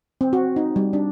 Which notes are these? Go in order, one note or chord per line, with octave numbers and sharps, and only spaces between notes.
C4
F#4
D#4
G3
D4